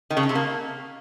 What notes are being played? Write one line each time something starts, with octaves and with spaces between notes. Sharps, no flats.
D#3
C#3
C#4
C3
A#3